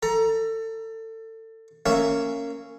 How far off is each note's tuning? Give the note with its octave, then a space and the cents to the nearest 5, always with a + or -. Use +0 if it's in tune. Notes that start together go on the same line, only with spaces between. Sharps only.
A4 +25 A#5 +15
A#3 -20 C#4 +0 E5 +0